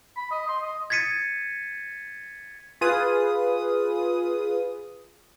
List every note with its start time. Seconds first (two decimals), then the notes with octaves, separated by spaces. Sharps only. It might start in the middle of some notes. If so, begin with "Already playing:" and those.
0.17 B5
0.31 D#5
0.48 C6
0.62 D#5
0.90 G#6 A6 B6 C#7 D#7
2.81 F4 G#4 B4 D#6